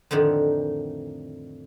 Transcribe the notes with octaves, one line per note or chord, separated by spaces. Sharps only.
F2 A2 D3 D#3